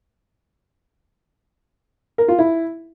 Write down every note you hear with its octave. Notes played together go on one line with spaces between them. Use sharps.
A#4
F4
E4